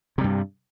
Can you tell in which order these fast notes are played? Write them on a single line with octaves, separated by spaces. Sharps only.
C3 G3 G2